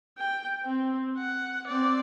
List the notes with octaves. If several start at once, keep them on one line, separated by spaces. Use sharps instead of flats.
G5
C4
F#5
C4 D5